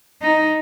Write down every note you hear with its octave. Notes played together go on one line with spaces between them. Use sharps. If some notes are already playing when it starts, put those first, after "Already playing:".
D#4